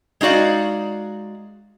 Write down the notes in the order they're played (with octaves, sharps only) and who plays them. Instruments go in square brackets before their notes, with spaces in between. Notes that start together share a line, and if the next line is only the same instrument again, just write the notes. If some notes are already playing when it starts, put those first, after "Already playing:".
[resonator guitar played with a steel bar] G#3 D#4 F#4 D5 F5